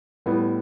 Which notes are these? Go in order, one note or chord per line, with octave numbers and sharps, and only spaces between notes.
A2 G3 B3 E4